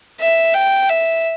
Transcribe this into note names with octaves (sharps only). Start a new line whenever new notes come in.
E5
G5
E5